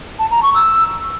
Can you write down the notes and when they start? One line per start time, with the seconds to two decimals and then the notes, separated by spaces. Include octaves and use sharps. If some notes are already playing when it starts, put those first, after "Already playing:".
0.19 A5
0.31 A#5
0.43 C#6
0.55 E6